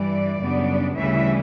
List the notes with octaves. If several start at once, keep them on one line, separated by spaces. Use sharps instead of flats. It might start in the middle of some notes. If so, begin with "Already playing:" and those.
Already playing: G2 E3 G3 D5
F#2 C#3 G3 B3 D4
D2 C#3 E3 G3 C#4 E5